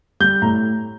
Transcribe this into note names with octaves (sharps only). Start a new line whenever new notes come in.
G3 G6
A2 A#5